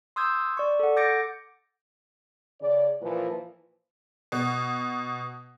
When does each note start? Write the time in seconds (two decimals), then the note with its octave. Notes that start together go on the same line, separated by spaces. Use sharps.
0.16 C6 D#6 E6 G6 G#6
0.57 D5 C#6
0.79 A4 F#5
0.97 D6 G6 A6 A#6 C#7 D7
2.61 C#3 D5
3.02 A#2 E3 F3 B4
4.32 B2